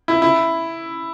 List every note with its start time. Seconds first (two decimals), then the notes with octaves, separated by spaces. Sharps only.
0.08 E4
0.22 E4